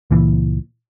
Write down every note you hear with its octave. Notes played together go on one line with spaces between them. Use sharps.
C#2 A#2 E3